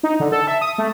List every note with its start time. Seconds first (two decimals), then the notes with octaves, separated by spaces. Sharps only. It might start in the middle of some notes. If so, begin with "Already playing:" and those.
0.03 D#4
0.20 D3
0.32 A4
0.47 E5
0.61 D#6
0.78 A3